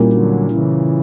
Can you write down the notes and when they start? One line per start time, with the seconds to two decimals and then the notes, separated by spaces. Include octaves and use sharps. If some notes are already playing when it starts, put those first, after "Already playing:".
Already playing: A#2 G3 A#3 C#4 E4
0.12 D3 F#3
0.51 C#3 E3